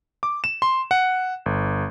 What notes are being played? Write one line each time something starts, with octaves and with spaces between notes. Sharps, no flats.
D6
E7
C6
F#5
G1